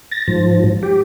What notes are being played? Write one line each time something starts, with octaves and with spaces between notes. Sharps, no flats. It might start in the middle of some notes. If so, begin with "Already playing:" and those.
A6 A#6
G#2 F3
G4